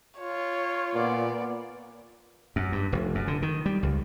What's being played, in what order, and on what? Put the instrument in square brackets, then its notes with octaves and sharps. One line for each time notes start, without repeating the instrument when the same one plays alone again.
[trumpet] F4 [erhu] C#5
[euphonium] A#2 [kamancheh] B3 D5
[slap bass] F#2
G2
F1
F#2
D3
D#3
G3
C#2